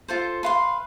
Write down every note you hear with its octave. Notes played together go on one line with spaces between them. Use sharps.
F4 A4 C5
B4 F5 C6